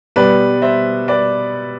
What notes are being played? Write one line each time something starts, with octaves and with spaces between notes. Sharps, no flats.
B2 G3 B3 B4 D5
C5 E5
B4 D5